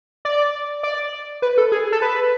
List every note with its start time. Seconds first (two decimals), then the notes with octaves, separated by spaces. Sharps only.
0.25 D5
0.83 D5
1.42 B4
1.58 A4
1.72 G#4
1.92 A4
2.02 B4